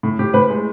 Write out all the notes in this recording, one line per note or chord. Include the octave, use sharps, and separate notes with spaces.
A2
A2 G4
A2 B4
G#3